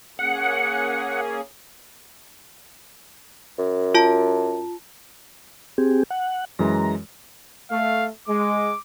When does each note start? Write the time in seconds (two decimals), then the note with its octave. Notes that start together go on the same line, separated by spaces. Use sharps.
0.19 A#3 C#4 G#4 F#5
3.59 F#2
3.95 F4 A5
5.78 C4 G4 G#4
6.11 F#5
6.59 F#2 E3 G#3 A#5
7.71 A3 F5
8.28 G#3 D6